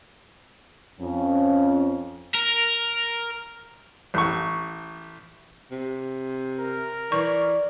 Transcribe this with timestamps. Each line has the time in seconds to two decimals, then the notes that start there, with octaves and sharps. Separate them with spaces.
1.00 F2 C#4
2.35 A#4
4.14 A1 C#6
5.71 C3
6.59 A#4
7.12 E3 D5 C#6